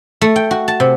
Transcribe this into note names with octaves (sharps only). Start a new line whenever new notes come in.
A3
G5
F#4
A5
C3